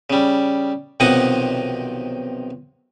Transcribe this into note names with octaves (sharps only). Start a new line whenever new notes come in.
C#3 G3
B1 C3 D#3 F3 D#5 F#5